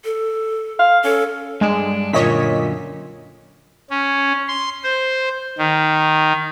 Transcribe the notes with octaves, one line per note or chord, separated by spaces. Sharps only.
A4
F5
C#4 A4
G2 G#3 D4
F#2 A#2 D3 C#5 D#5 B6
C#4
C6
C5
D#3